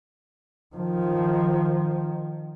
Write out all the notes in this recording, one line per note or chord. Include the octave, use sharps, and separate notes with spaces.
D#3 F3